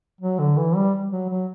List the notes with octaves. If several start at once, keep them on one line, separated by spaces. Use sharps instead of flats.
F#3
D3
E3
G3
F#3
F#3